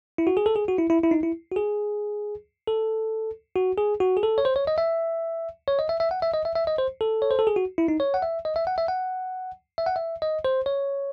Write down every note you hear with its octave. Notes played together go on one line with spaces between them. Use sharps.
E4
F#4
G#4
A4
G#4
F#4
E4
E4
E4
D#4
E4
F#4
G#4
A4
F#4
G#4
F#4
G#4
A4
C#5
C5
C#5
D#5
E5
C#5
D#5
E5
E5
F#5
E5
D#5
E5
E5
D#5
C5
A4
C#5
C5
A4
G#4
F#4
E4
D#4
C#5
F#5
E5
D#5
E5
F#5
E5
F#5
E5
F#5
E5
D#5
C5
C#5